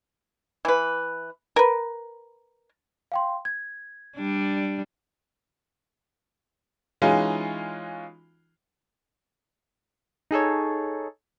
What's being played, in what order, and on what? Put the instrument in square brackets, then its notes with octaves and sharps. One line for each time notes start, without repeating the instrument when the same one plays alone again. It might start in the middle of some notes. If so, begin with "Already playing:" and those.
[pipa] E3 B4
A#4 B4
[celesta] F5 G5 C6
G#6
[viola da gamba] G3 D4
[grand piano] E3 G#3 C#4 D#4 F4 F#4
[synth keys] D#4 G#4 A4 C#5